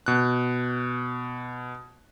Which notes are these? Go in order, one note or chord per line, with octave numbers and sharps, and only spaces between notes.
B2 F#6